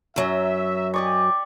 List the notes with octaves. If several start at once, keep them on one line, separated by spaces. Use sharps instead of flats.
F#2 F#3 E5
G4 D5 D#5 G#5 C#6